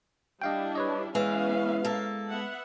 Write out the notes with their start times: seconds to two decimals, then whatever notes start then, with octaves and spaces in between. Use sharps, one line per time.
0.42 G3 D4 E4 D#5 F5 G5
0.75 B4 C#5 D#5
1.15 E3 G#3 B3 C#4 F5
1.85 A#3 A4
2.28 B3 E5 F#5